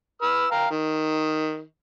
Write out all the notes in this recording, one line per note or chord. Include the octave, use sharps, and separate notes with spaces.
B4 E6 F6
F5 G5 A#5
D#3